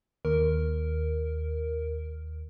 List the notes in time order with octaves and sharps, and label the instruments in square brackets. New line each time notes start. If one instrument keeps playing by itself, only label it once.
[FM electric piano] D#2 [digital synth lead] A#4